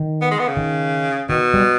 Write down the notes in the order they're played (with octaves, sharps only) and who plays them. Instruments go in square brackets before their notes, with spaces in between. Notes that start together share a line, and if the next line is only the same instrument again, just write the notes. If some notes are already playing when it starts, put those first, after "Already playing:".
Already playing: [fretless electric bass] D#3
[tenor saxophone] B3
G#3
B3
C#3
[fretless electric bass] D#3
[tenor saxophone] B2 [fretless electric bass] D#3
[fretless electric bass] G3